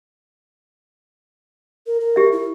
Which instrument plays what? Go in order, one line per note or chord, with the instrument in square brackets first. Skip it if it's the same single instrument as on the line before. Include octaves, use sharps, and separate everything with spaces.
[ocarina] A#4
A#4
[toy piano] G4 E5
[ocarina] E4